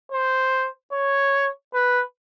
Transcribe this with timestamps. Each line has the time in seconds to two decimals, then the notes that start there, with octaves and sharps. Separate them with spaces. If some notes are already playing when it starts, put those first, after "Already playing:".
0.12 C5
0.93 C#5
1.74 B4